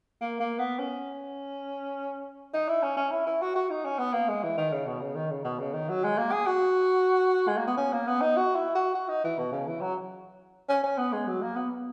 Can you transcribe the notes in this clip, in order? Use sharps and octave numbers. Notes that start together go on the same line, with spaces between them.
A#3
A#3
B3
C#4
D#4
E4
C#4
C#4
E4
E4
F#4
F#4
D#4
C#4
B3
A#3
G#3
E3
D#3
C#3
B2
C#3
D#3
C#3
B2
C#3
D#3
F#3
G#3
A#3
G#4
F#4
G#3
A#3
B3
C#4
A#3
B3
D#4
F#4
E4
F#4
F#4
D#4
E3
B2
C#3
E3
F#3
C#4
C#4
B3
G#3
F#3
A#3
B3